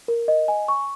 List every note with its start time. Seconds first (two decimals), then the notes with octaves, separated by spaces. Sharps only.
0.08 A#4
0.28 D#5
0.48 G#5
0.68 C#6